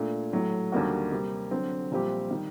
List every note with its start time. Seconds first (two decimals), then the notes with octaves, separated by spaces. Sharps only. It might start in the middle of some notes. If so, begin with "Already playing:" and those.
Already playing: A#2 A3 D4
0.33 A2 F#3 A3
0.72 D#2 D3 G3 A#3 F#4
1.12 C3 G3 A#3
1.51 D3 F#3 C4
1.91 A#1 A#2 G3 C4 G4
2.31 D#3 G3